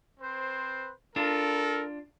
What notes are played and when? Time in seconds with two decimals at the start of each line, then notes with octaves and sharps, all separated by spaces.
0.20 C4 B4 C5
1.16 D4 F4 A4 A#4